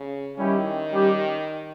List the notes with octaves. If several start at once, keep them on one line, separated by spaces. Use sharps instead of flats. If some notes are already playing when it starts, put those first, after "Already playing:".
Already playing: C#3
D#3 G3 C#4 E4 G4
G3 C#4 G4